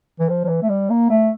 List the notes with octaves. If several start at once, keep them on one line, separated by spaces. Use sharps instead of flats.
E3
F3
F3
E3
A3
G3
A#3
A3